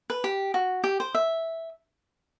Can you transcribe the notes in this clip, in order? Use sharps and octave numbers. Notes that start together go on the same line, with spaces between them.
B4
G4
F#4
G4
C5
E5